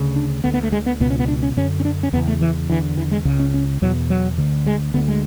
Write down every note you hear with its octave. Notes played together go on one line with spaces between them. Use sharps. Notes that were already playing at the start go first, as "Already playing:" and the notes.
Already playing: D2 C#3
D4
D2 D3 B3
B3
A3
G#3
B3
C#2 B2 B3
C#4
B3
D4
C#4
F#2 D3 C#4
C#4
D4
C#4
E2 C#3 B3
A3
E3
E2 D3 E3
E3
G#3
C#2 C#3
C#4
C#4
E2 B2 F#3
F#3
D2 D3
G#3
D2 D3 B3
G#3